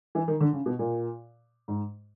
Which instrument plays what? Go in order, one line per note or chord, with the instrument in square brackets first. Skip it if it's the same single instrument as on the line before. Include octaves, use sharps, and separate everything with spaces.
[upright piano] E3
D#3
D3
C#3
B2
A#2
G#2